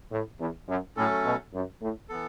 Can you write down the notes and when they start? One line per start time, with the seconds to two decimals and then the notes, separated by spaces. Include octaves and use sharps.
0.11 A2
0.39 E2
0.68 F#2
0.97 A2 F#3 A3 C#4 A4
1.25 B2
1.54 F#2
1.81 A2
2.09 E3 B3 A4